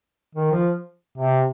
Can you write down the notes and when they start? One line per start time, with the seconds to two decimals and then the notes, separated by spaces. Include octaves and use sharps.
0.35 D#3
0.51 F3
1.18 C3